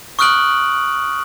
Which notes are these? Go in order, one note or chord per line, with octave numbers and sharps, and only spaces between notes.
C#6 D#6 F6 F#6 D7 F#7